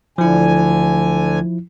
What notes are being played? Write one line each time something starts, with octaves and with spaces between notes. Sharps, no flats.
D2 D3 F3 E4 G#5